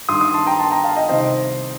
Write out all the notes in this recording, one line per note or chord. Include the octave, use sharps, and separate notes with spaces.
G2 D#3 C6 D#6
C6 D#6
A5 C6
G5 A#5
A5 C6
G5 A#5
F5 A5
D#5 G5
C2 C3 D#3 C5 D#5